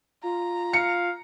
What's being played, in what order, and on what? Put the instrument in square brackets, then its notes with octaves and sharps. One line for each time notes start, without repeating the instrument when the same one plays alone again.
[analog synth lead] F4 [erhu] A#5
[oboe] F5 [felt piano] C#7